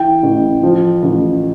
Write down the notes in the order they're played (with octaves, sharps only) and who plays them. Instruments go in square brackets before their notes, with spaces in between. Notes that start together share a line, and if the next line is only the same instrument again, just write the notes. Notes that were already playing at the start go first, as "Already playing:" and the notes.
Already playing: [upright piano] E3 G5
A1
F3
A1